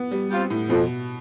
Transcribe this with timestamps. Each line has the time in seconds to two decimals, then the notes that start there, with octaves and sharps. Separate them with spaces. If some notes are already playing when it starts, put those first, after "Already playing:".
Already playing: B3
0.11 G3
0.31 G3 C4 F4
0.50 A2
0.69 F2 B2